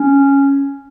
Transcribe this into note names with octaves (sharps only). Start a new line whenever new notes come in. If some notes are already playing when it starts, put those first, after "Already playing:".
Already playing: C#4